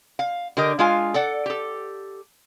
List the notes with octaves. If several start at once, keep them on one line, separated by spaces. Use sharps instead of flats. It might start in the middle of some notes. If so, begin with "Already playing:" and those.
F5
D3 G4 A#4 D#5
G#3 D4 F4 F5 G#5
A4 D5 F#5
G4 A4